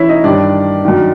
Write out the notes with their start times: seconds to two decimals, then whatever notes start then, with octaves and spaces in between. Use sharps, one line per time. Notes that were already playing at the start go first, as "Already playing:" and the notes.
Already playing: E3 C#4 E4 E5
0.09 D#4 D#5
0.24 G2 D#3 D4 D5
0.85 F#2 D#3